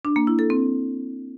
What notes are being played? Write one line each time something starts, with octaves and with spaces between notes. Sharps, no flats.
D4
A#3
E4
A4
C4